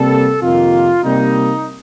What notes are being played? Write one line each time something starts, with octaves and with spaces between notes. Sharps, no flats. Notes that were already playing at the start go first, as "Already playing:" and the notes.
Already playing: C3 G3 A#3 A4
F2 C3 D#3 A#3 F4
C3 G3 A#3 D#4